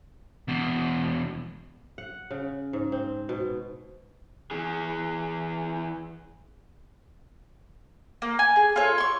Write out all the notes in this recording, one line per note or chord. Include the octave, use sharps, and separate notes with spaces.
E2 B2
F#5
C#3
G#2
C4
B2
E3 G#4
A#3
G#5
G#4
F4 A4 C#5
C6 C#6